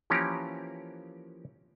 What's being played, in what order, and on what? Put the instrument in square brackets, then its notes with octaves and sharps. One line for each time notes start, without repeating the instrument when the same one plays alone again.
[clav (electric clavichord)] E3 F3 A#3 C#4 G4 A#4